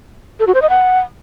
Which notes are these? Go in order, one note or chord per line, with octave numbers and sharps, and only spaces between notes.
A4
F#4
C5
D#5
F#5